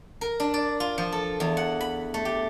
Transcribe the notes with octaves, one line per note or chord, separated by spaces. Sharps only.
A#4
D4
D5
F4
F3
A4
E2
F#5
B5
A3
G4